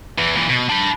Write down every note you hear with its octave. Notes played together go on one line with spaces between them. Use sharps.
E2 E3
A#2 E3
B2
D4 B5